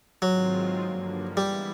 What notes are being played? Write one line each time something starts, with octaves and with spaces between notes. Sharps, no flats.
G#2 D#3 F#3 G#3 C4 F4
G2 D3 F3 A#3
E3 G3 G#3 B3 E4